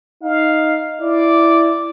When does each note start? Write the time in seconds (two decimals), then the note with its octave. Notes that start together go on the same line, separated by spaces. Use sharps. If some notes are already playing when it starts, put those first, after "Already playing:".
0.23 D#4 F5
1.01 E4 D5